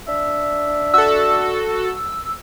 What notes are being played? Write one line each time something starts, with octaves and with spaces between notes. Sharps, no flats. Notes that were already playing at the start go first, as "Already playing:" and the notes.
D4 E5
F#4 A4 E6